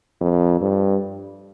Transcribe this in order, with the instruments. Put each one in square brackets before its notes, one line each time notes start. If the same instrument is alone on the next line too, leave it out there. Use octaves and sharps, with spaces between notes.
[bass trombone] F2
G2